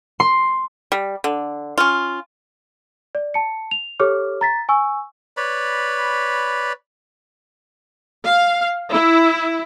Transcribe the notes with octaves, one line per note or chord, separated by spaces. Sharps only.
C6
G3
D3
C#4 F4
D5
A5 C#7
F7
G4 A4 C#5 D6 F6
A#5 A6 B6
G#5 C#6 E6
B4 C#5 D5 B5
F5
E4